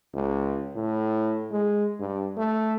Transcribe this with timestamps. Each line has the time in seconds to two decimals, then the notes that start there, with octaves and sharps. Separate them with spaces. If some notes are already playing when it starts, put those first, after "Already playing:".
0.14 C#2
0.76 A2
1.51 G#3
2.00 G2
2.37 A3